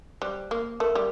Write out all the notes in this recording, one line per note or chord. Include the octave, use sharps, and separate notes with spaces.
G3 C5
A#3
A3 A#4
G3